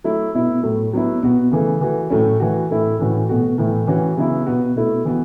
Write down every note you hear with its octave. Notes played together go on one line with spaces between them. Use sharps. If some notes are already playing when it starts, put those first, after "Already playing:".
F#3 A3 E4
B2 B3 E4
A2 F#3 A3
F#3 B3 E4
B2 B3 F#4
C#3 E3 A3
E3 A3 F#4
A2 F#3 A3 C#4
E3 A3 F#4
A2 A3 E4
A2 E3 C#4 F#4
B2 A3 F#4
A2 E3 A3
E3 C#4 F#4
C#3 F#3 B3 E4
B2 B3 F#4
B2 A3 E4
E3 B3 F#4